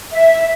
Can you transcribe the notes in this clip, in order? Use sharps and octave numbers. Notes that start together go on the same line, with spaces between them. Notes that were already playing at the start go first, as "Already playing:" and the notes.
E5